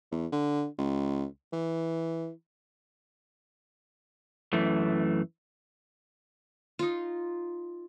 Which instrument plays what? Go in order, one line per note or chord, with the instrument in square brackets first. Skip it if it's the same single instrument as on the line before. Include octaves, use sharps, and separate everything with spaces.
[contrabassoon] E2
D3
C#2
E3
[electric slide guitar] F#2 E3 A3
[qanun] D#4 F4